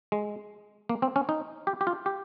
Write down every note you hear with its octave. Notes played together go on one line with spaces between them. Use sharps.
G#3
A#3
C4
C#4
D#4
G4
G4
F4
G4